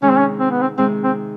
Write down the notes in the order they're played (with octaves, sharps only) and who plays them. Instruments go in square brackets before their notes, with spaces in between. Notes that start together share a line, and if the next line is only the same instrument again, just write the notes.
[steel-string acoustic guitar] C3 D#3 G#3 [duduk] C#4
[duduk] C4
C#4
C4
B3
C4
[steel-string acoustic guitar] C3 D#3 G#3 [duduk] C4
[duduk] C4